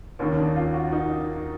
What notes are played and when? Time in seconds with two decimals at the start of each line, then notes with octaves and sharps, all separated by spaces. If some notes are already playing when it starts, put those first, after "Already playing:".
0.19 D#2 D#3 C#4
0.37 D4
0.56 F4
0.74 F#4
0.92 D#4